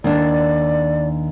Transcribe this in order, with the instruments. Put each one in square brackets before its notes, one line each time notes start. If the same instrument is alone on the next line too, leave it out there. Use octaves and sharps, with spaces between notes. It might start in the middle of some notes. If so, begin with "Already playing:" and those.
[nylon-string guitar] D#2 D4 [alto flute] D5